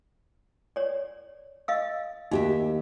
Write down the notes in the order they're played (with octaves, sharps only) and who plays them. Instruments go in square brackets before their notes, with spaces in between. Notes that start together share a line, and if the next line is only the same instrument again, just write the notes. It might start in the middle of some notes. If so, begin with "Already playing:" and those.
[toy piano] C#5 D5
D#5 F5 E6
[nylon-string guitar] D#2 G4 E5 [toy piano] D#4